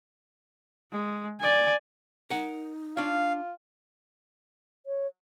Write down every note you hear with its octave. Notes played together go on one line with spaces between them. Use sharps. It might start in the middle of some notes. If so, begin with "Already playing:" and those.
G#3
D5 G#5
D#4 A#4 F#5
D4 F4 C#5 F5
C#5